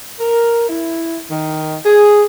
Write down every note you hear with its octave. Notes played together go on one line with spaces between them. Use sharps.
A#4
E4
D#3
G#4